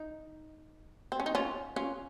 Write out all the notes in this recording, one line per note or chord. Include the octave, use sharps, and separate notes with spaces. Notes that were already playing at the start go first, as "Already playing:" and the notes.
Already playing: D#4
C4
C#4
D#4
C#4 F4
C#4 F4